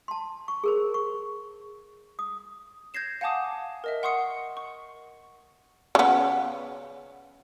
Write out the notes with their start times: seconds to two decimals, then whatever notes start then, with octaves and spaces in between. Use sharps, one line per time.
0.08 A5 C6
0.48 C#6
0.64 G#4 A#4 C5
0.94 C#6
2.19 D#6
2.94 G6 G#6 A#6 C7 E7
3.21 F5 F#5 G#5 A5 D6 D#6
3.84 A#4 D#5 E5
4.03 F#5 C6 C#6 D#6 C7 C#7
4.57 C#6
5.95 C#3 B3